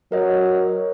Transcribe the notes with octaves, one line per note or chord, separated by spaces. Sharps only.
F#3 A#4 D#5